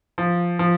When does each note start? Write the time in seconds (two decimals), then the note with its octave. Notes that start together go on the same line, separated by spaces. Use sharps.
0.18 F3
0.59 F3